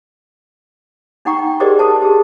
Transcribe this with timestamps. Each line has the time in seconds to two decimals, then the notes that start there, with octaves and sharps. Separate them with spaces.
1.25 D4 D#4 F#5 G5 A#5 C#6
1.39 G5
1.60 G4 G#4 A#4 C5 D5 D#5
1.79 A4 C5 A5
2.02 G4 G#4